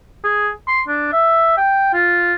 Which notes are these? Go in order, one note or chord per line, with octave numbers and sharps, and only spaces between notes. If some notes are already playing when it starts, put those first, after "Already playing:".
G#4
C6
D4
E5
G5
F4